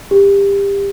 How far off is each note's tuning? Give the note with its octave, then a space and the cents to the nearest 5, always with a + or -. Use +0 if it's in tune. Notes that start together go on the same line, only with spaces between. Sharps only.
G4 +25